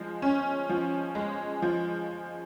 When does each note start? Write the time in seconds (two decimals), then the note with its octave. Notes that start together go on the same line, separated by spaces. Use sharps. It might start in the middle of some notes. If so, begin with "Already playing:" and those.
Already playing: F3 G#3
0.22 C#4
0.69 F3
1.15 G#3
1.62 F3